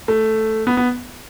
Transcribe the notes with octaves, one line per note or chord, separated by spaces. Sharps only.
A3
B3
B3